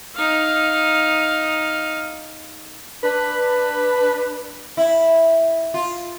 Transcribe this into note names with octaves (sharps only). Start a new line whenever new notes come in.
D#4 F5
D4 B4
E4
F4